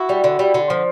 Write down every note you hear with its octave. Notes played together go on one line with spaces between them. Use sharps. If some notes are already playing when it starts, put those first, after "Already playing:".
Already playing: E4 F#4
G3
D3
G3
D3
F3